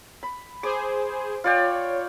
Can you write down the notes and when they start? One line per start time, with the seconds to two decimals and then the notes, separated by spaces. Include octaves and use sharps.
0.23 B5
0.63 G#4 C5 D6
1.44 F4 C#5 D5 G5